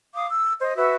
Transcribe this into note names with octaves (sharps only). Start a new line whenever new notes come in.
F5 D6 D#6
E6
C5 D#5
F#4 B4 E5 E6